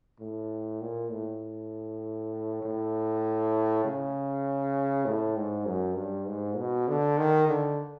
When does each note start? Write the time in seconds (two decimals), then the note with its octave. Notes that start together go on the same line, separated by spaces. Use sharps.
0.20 A2
0.81 A#2
1.11 A2
2.62 A2
3.85 C#3
5.05 A2
5.36 G#2
5.66 F#2
5.96 G2
6.27 G#2
6.57 B2
6.88 D3
7.18 D#3
7.48 D3